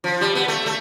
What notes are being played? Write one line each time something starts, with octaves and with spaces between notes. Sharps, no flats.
F3
G3
B3
A3
A3